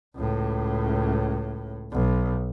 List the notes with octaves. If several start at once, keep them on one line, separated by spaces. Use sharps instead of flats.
C#2 A2
B1